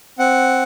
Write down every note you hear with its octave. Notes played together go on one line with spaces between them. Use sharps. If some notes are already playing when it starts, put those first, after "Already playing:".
C4 F#5